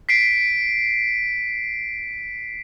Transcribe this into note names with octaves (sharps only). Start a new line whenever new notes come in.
B6 C7 D7